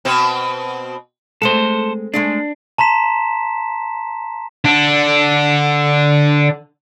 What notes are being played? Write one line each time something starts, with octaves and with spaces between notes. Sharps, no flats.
B2 C4
G#3 A3 C4 A4 C5
G#3 A3 D4 G#4
A5 A#5 C6 B6 E7
D3 D4